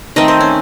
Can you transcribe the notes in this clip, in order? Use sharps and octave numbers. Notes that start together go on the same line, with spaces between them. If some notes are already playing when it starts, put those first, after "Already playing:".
D#3 A3 C4 D#5
C5
C#4